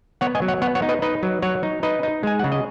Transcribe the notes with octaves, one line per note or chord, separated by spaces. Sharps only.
B3 C#5 F#5
D#5 G#5
F#3
C#5 F#5
B3 C#5 F#5
C#5 F#5
D#4
B4 D#5
D#4 B4 D#5
F#3
F#3 C#5 F#5
D#4
D#4 B4 D#5
D#4
G#3 G#5
C#3 F#5
D#5